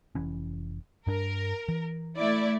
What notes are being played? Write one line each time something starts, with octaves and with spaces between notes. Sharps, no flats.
F1 E3 C#4
G2 D4 A#4
E3
A3 E4 D5